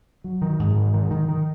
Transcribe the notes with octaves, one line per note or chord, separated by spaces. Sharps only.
F#3
D#3
G#2
D#3
D#3
D#3
D#3